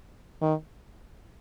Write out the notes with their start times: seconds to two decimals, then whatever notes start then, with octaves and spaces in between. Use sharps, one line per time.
0.42 D#3